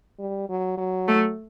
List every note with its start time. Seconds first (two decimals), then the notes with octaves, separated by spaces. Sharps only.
0.19 G3
0.49 F#3
0.78 F#3
1.08 A3